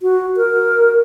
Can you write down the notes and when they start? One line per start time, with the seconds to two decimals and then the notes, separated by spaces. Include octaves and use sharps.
0.02 F#4
0.37 A#4